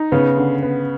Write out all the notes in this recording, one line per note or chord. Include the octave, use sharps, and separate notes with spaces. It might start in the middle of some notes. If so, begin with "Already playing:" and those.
Already playing: D#4
C#3 B3
D3
B3